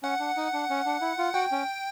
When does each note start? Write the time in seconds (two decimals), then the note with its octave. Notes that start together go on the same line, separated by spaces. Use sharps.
0.03 C#4 F#5
0.19 D4
0.37 D#4
0.53 D4
0.70 C#4
0.85 D4
1.01 E4
1.18 F4
1.34 F#4 G5
1.52 C#4